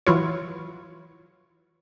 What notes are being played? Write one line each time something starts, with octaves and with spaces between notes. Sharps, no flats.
E3 F#3 F4 C#5